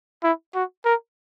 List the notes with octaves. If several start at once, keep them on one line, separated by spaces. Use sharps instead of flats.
E4
F#4
A#4